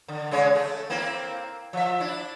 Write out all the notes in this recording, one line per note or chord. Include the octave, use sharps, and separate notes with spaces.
D3
C#3 G#3 C#5
A3
A#3 C4 E4
F3 E5
D4 E4